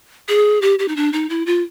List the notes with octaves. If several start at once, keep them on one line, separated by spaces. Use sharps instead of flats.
G#4
G4
G4
D#4
D4
D#4
E4
F4